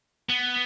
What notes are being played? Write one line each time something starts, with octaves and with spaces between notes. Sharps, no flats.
B3